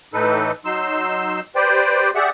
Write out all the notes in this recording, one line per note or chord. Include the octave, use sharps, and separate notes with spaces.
A2 E3 D#4 A4 B4
F#3 D#4 C6 E6
G4 B4 C5 D5 G5
G4 G#4 D5 E5 F#5